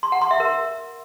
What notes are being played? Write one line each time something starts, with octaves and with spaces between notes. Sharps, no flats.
C6
F#5
C6
E5
A#4